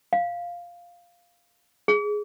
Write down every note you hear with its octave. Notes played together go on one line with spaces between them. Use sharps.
F5
G#4